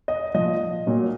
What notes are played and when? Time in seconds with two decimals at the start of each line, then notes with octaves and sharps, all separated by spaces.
0.08 D#5
0.34 A#2 F3 D#5
0.87 A#2 F#3